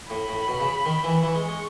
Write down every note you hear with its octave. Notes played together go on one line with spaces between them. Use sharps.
A2 B5
A2
B2
C#3
D#3
E3
E3 C#6
G#3
G#3